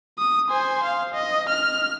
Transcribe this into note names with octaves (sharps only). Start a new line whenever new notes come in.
D#6
C5 G#5
F5
D#5
F6